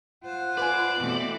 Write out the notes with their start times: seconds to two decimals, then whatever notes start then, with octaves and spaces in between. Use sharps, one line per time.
0.24 F4 C5 F#5
0.57 B4 D5 G#5
1.00 B2 E3 A3 C4